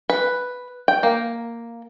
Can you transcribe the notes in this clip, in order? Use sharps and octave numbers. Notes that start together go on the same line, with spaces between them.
B4
G5
A#3